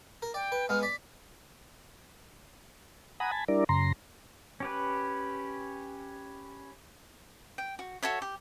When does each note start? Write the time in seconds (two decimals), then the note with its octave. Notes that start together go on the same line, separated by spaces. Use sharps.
0.22 A#4
0.34 D5 G5
0.52 B4
0.69 G#3 B3 F6
0.83 D5 B6
3.20 F#5 G#5 A#5 B5 D#6
3.31 G#5 A5 B5
3.48 G3 D4 E4 A#4 D5
3.69 F#2 C#3 A#5 C6
4.60 C#4 G4 B4
7.58 G5
7.79 F#4
8.03 F#4 A4 C#5 E5
8.22 G4